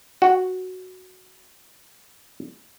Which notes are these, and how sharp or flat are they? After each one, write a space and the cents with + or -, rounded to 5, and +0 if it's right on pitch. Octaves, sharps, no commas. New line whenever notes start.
F#4 +0